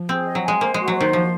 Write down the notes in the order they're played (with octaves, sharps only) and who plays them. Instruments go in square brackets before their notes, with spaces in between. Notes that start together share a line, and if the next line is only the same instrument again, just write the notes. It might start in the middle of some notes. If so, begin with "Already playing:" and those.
Already playing: [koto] F3
[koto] C4 [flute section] G#4
[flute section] D#5
[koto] F#3
[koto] G#3 [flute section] G#5
[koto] A#3 [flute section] C5
[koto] G#3 [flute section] F#4
[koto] F#3
[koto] D#3 [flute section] C5
[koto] F3 [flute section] F#4